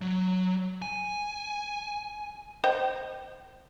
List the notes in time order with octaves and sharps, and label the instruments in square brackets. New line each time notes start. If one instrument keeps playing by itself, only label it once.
[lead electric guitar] F#3
G#5
[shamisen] C5 D#5 G5